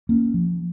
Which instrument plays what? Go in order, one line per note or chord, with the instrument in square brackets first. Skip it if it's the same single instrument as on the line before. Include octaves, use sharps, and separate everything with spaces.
[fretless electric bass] A#3 C#4
F3